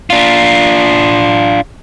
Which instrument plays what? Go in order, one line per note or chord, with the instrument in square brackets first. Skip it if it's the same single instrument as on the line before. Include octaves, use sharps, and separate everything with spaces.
[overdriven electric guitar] D4 F4